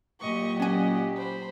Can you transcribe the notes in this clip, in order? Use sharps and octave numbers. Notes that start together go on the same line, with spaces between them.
A#2 F#3 G4 D#5 C#6
C#4 D#5 F#5 G#5
C5 B5